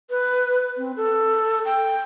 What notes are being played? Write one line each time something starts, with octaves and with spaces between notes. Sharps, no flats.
B4
C4
A4
G5